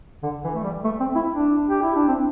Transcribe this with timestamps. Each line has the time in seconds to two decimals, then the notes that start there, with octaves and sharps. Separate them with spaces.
0.23 D3
0.44 E3
0.55 A3
0.64 G3
0.84 A3
1.00 C4
1.15 E4
1.32 D4
1.69 G4
1.83 E4
1.95 D4
2.08 C4